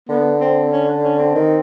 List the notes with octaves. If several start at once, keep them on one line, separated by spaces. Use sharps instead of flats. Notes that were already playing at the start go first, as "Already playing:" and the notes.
D3 B3
C4
C#4
D4
C#4
C4
D#3